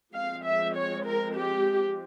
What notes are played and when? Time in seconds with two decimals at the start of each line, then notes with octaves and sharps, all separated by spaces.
0.14 F3 G#3 C4 F5
0.44 E5
0.75 C#5
1.05 A#4
1.36 G4